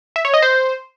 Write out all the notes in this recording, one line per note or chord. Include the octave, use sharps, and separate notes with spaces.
E5
C#5
D#5
C5